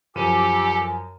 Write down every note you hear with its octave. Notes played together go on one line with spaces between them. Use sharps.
F#2 F3 G4 A4 G#5 D#7